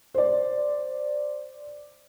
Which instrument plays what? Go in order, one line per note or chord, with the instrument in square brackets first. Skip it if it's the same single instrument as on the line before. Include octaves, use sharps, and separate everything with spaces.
[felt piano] C5 D5